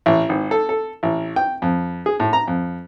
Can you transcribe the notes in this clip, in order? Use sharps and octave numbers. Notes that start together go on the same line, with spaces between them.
A1
G#1
A4
A4
A1
G5
F2
G#4
A2
A#5
F2